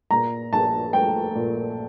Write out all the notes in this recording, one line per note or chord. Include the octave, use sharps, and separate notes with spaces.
A#2 A#5
A#1 A5
A3 G5
A#2